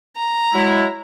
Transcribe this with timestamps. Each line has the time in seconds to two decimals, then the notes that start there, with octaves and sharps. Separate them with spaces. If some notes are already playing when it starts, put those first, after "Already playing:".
0.17 A#5
0.53 F#3 G#3 E4